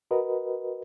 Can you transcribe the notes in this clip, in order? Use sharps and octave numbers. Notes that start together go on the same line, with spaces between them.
F#4 A#4 B4 D#5